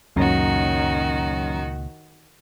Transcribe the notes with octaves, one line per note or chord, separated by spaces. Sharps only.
C#2 F#2 A#2 D#3 F#4